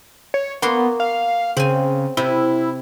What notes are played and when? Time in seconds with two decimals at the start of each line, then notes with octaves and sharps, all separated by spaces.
0.34 C#5
0.62 A#3 B3 F#4 C6
1.00 F5
1.57 C#3 C4 G#5
2.17 C3 E4